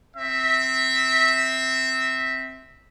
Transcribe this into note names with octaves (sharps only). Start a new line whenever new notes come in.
C4 E5